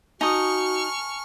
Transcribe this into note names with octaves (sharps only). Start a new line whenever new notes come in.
D#4 F#4 G#5 A5 C#6 D#6 F6 G7